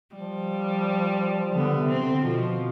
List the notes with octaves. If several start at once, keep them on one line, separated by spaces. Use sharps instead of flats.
F3 G3
D3 B3
C3
C4
D3
B2 F3